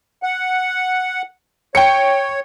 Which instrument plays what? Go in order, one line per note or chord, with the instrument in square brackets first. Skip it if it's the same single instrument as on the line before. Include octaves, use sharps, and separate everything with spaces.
[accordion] F#5
[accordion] C#5 [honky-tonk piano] G5 C#7